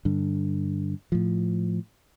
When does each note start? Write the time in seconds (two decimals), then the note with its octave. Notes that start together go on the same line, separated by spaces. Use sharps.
0.05 G2 D3
1.12 A2 F3